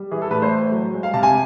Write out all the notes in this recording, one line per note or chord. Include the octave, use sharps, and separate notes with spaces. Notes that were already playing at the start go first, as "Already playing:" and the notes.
Already playing: G3
E3 G#4
A4
A2 B4
C5
A3
F#3
G#3
F5
C3 A5
G#5